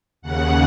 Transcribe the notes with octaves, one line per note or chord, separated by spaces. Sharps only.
D#2 C#3 F#5